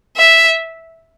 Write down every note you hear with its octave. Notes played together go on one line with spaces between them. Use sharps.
E5